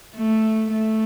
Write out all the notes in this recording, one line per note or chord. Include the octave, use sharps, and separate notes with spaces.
A3
A3